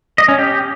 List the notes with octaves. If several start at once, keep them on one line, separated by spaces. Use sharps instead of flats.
D#5
C#4
G4